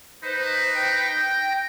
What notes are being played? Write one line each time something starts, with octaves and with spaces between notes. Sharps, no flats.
D#4 B4 C5
G5 G6 A#6